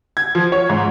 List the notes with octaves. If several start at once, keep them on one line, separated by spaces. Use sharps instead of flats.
G#6
F3
C#5
G#2